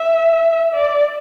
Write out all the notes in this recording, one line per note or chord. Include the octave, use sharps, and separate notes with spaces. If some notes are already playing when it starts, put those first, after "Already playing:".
Already playing: E5
D5